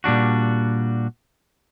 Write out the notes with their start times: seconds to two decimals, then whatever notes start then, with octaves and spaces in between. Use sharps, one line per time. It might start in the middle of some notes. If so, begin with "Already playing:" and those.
0.04 A#2 G3 D4 F#4